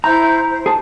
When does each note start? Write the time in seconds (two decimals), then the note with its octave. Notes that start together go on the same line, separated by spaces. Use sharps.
0.04 E4 C5 A#5 G6
0.50 C5
0.66 G#4 A5